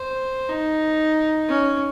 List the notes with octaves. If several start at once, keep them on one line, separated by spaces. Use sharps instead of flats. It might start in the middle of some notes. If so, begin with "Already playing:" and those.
Already playing: C5
D#4
C#4